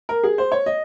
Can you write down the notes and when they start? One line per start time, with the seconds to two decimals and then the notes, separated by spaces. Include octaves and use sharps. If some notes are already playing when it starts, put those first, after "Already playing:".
0.09 A#4
0.23 G#4
0.38 C5
0.52 C#5
0.66 D#5